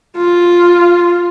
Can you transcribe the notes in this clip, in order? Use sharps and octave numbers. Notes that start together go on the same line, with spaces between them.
F4